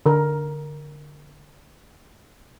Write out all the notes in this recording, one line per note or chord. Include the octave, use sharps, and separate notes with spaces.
D3 A#4